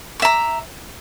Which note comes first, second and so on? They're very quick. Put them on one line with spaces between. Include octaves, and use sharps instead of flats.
D6 E5 A#5